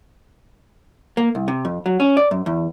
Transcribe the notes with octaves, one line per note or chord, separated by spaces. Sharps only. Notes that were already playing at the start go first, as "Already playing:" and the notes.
A#3
C2
C3
F2
F#3
C#4
D5
F#2
E2